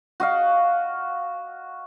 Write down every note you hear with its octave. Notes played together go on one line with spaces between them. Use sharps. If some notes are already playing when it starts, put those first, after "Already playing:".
F#4 D#5 F5